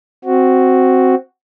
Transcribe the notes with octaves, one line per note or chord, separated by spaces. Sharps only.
C4 F#4